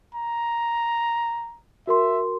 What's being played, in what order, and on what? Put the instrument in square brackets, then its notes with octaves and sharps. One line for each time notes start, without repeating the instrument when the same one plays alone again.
[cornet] A#5
[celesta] F#4 A#4 C6 [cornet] E5